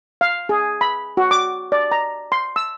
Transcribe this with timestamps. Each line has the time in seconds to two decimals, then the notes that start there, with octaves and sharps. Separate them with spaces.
0.21 F5
0.49 G#4
0.81 B5
1.17 F#4
1.31 D6
1.72 D5
1.92 A#5
2.32 C6
2.56 E6